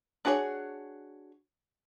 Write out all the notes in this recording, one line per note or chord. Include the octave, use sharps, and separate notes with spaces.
D4 F#4 G#4 A4 C#5